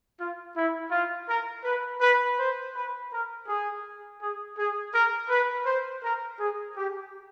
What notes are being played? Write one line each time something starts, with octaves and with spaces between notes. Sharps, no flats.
F4
E4
F4
A#4
B4
B4
C5
B4
A#4
G#4
G#4
G#4
A#4
B4
C5
A#4
G#4
G4